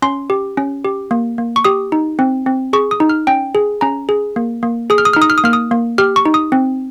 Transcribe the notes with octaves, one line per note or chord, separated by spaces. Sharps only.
C#4 C6
G4
C#4
G4
A#3
A#3
C#6
G4 D#6
D#4
C4
C4
G#4 C#6
D#6
D#4
F6
C#4 G5
G#4
C#4 A#5
G#4
A#3
A#3
G#4 D#6
F6
D#6
D#4 F6
D#6
F6
D#6
A#3 F6
D#6
A#3
G4 F6
C#6
D#4
D#6
C4